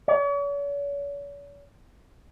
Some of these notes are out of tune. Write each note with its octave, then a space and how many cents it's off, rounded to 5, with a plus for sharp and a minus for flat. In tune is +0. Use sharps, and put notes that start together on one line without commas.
C#5 +45